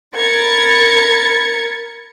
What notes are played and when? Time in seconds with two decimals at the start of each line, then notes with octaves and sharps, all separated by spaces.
0.16 A#4 B5 G#6 A6 C#7